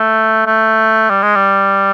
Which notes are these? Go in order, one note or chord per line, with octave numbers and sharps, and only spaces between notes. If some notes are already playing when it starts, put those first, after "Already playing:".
Already playing: A3
A3
G3
G#3
G3